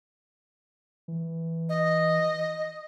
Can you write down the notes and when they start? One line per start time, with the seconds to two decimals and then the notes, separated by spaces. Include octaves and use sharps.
1.08 E3
1.69 D#5